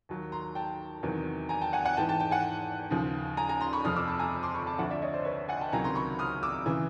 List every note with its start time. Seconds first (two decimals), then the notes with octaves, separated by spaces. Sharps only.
0.09 D#2 D#3 F#3
0.32 A#5 C6
0.55 G5 A5
1.03 E2 C3 D#3 F#3
1.49 G#5 A#5
1.61 G5 A5
1.73 F#5 G#5
1.85 F#5 G#5
1.97 G#2 E3 G5 A5
2.08 G5 A5
2.20 G5 A5
2.31 F#5 G#5
2.91 D#2 C#3 F3
3.37 G#5 A#5
3.49 G#5 A#5
3.61 A#5 C6
3.73 B5 C#6
3.85 F2 C3 F3 D#6 F6
3.96 D6 E6
4.08 A5 B5
4.19 G#5 A#5
4.43 C6 D6
4.54 B5 C#6
4.66 A5 B5
4.79 D2 D3 F3 E5 F#5
4.90 D5 E5
5.02 C#5 D#5
5.13 C5 D5
5.25 B4 C#5
5.49 F#5 G#5
5.61 G5 A5
5.72 C#2 C3 D#3 F#3 G#5 A#5
5.84 A#5 C6
5.95 B5 C#6
6.19 D#6 F6
6.43 D6 E6
6.66 C#3 E3